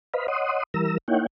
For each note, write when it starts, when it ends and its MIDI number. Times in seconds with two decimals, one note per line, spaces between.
0.14 0.27 71
0.14 0.27 72
0.14 0.27 75
0.14 0.27 77
0.14 0.27 83
0.28 0.63 73
0.28 0.63 75
0.28 0.63 78
0.28 0.63 84
0.28 0.63 87
0.74 0.98 52
0.74 0.98 55
0.74 0.98 70
0.74 0.98 82
0.74 0.98 88
1.08 1.26 58
1.08 1.26 63
1.08 1.26 64
1.08 1.26 73
1.08 1.26 78
1.08 1.26 79